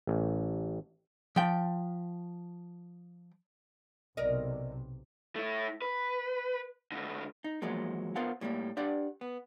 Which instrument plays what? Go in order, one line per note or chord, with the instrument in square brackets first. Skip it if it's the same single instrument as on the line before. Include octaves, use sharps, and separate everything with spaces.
[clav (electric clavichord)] A1
[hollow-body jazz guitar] F3 G5
[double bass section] B1 C3 [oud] A#4 D5 D#5
[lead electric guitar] A3 E4
B4
C#2 D3
[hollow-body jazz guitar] D#4
E2 F3 F#3 G#3 A#3
B3 F4 A#4 C5 F5 F#5
A2 G3 G#3 A#3
D4 G4 D5 F#5
B3